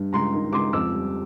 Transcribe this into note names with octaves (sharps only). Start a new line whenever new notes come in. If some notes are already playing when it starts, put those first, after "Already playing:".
Already playing: G2
C#2 A#5 C6
D#3
C#2 C6 D6
F2 D6 E6
G3